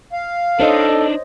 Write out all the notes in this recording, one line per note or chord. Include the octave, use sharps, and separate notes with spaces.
F5
D4 D#4 A4 C5 C#5 D#5